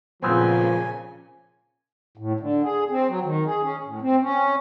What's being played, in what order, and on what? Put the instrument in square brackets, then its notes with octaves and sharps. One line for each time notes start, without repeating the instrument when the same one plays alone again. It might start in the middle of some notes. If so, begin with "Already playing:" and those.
[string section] A#2 C#3 [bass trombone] F3 [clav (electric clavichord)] B3 C4 [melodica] G#5
[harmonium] A2
D3
G#4
C4
F#3
D#3
G#4
C#4
A2
C4
C#4